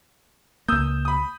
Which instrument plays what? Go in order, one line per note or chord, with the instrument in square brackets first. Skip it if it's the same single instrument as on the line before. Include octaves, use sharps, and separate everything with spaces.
[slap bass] C#2 A#3 [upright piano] D#6 E6 G6
[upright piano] B5 D#6